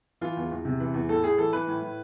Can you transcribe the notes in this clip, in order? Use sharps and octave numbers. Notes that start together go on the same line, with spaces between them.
E3 F4
E2
E2
C3
E3
E2
A2 A4
A2 G#4
E3 A4
E3 B4
A2
A2